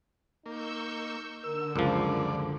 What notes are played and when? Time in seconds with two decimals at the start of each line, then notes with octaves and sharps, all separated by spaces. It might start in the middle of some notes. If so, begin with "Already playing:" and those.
0.46 A#3 D#4 C#6 E6 G6
1.44 D3 A#4 E6
1.76 C#2 F#2 F3 A#4 D5